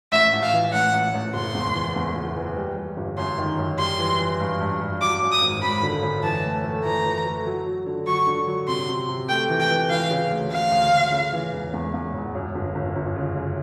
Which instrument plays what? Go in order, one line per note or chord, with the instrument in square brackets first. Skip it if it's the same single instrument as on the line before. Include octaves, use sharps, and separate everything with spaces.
[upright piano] A1 [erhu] E5
[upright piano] A1
[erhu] F5
[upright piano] E3
[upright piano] A1 [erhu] F#5
[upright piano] A1
A1
[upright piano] F#1 [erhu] C6
[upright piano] E2
E3
E2
F#1
E3
G3
G3
G1
[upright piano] F#2 [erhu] C6
[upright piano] D#3
F#2
[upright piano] G3 [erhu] C6
[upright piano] E3
E3
G2
G2
G2
[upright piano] F#3 [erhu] D6
[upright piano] F#2
[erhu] D#6
[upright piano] G#1
[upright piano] G#1 [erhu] B5
[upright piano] D3
F#2
[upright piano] E3 [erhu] A5
[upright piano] A2
A3
[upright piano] E3 [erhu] A#5
[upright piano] E3
A3
F#3
F#3
D3
[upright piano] F#3 [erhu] C#6
[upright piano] D3
F#3
[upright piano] C3 [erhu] C6
[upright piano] C3
C3
[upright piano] A3 [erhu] G5
[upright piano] E3
[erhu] G5
[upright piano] E3
[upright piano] E3 [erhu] F5
[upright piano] C#3
D2
[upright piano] C#3 [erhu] F5
[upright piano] D2
D2
C#3
E3
E1
E2
E2
E1
F#2
G1
G1
G1
C#3
F#2